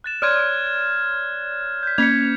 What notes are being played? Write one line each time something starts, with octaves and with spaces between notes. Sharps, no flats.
F#6 A6 E7
C#5 D5 C6 F6 F#6 G#6
G6 B6
A#3 C#4 G#6 B6 C#7 F7